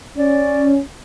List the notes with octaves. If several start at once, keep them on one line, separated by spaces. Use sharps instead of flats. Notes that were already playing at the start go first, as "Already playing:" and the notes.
C#4 D5